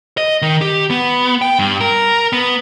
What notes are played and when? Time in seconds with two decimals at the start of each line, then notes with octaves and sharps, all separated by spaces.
0.18 D#5
0.42 D#3
0.61 G4
0.90 B3
1.42 G5
1.59 G2
1.81 A#4
2.33 B3